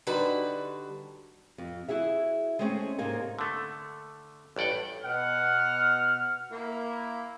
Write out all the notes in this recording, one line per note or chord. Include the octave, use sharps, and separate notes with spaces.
D3 G3 D4 D#4 F#4 B4
F2
E4 F#4 G#4 E5
G#3 A3 C4 C#4 F#4 G#4
G#2 C3 A#3 D#4 G#5
D3 A3
A1 G2 D5 F#5 G5
B2 F#5 F6
A#3 E4